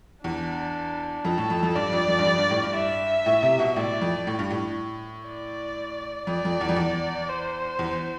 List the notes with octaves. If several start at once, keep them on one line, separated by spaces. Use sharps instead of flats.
E2 D4
F2 A4
A2
F2
F2
G2 D5
F2
F2
G2
F2
G2
A2
G2
E5
A2
C3
B2
A2 D5
F2
A2
G2
A2
D5
F2 D5
F2
E2
F2
E2
C5
E2